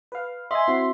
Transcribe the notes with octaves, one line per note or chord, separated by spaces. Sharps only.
B4 F5
D#5 E5 G#5 C6
C4 E4 F#4